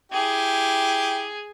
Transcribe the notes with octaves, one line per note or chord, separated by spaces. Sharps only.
E4 G4 G#4